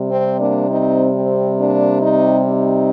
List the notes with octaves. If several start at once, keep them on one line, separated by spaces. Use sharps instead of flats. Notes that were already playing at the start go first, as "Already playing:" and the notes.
Already playing: C3 G3
C4
A#3 D4
C4 D#4
C4
A#3 D4
C4 D#4
C4 D#4